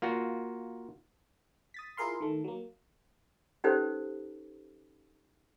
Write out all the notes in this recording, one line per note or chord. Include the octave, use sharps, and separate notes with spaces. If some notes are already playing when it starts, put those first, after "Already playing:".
A#3 F4 F#4
D#6 A6 B6
E4 F4 G#4 A#4 F5 C6
D#3 A3
F#3 A#3
C#4 D#4 G4 A4 B4 C5